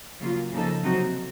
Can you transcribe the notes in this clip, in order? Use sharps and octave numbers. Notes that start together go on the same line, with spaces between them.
C#3 F#3 A#3 F4
C#3 F3 A#3 D#4 A4
C3 F#3 C4 D#4 F#4